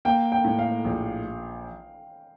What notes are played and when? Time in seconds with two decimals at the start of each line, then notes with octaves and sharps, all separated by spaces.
0.05 A#3 G5
0.32 G5
0.44 A2
0.59 F5
0.84 A#1